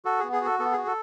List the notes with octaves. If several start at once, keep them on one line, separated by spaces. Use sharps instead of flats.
F#4 A4
G#4
B3
G#4
F#4 A4
B3 A4
F#4 G#4
A4